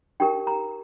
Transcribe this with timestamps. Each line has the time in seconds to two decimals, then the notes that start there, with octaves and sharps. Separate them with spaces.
0.20 D#4 G4 A#4 G5
0.47 A#5